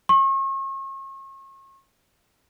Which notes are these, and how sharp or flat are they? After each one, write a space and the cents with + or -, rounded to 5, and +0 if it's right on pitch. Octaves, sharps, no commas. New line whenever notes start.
C#6 -40